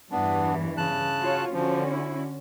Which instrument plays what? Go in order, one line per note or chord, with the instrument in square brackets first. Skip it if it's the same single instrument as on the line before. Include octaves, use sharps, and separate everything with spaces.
[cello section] E2 G2 E3 [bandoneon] B3 D4
[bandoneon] C#3 A5 F#6
[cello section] F4 F#4 C#5
[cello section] D3 C#4 F#4 [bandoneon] F3
[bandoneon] E4